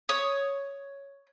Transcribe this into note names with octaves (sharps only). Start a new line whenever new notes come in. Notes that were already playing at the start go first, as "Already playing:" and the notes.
C#5 D#6